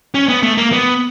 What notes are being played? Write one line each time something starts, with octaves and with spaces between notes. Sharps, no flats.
C#4
B3
A3
A#3
B3